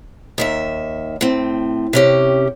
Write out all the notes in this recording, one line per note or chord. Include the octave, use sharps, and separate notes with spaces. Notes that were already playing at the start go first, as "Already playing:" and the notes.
D#2 D#3 E5
A2 C4
C3 C#4 G4